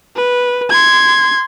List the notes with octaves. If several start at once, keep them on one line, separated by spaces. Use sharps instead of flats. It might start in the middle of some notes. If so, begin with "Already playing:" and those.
B4
C6 G#6